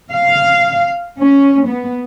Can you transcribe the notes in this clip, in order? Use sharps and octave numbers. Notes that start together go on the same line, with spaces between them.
F5
C#4
B3